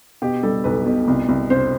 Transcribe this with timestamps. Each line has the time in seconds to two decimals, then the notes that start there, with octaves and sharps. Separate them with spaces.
0.22 B2 G4
0.43 G3 A4
0.64 B1 B4
0.85 B2
1.08 C2
1.29 C2
1.50 C3 C5